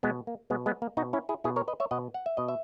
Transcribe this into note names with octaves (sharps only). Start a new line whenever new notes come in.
B2 G#3 B3
A#3
B2 G#3 B3
G#3 B3
A#3
B2 D#4 F#4
C#4 E4
E4 G#4
B2 E4 G#4
A#4 C#5
B4 D#5
C#5 E5
B2 D#5 F#5
F#5
E5
B2 D#5
E5